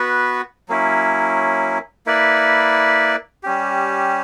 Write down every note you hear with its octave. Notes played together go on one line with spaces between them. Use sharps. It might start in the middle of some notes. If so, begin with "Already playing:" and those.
Already playing: B3 F#4 B4
F#3 A#3 C#4 E4
A#3 E4 B4 D5
G3 C#4 G4